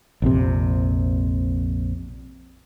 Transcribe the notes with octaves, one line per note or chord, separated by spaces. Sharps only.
A#1 F2 C3